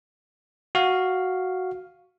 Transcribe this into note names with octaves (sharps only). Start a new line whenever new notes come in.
F#4 F5